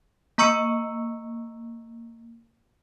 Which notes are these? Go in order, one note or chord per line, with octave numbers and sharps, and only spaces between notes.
A#3 A#5 C#6 E6 C#7